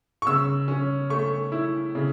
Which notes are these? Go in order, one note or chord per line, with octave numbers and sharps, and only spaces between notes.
C#6
C#3 E6
C#4
A3 C#6
E4
C#3